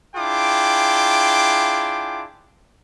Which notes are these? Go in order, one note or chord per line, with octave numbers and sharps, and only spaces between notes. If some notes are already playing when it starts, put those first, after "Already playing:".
D4 E4 F4 G#4 G5 D6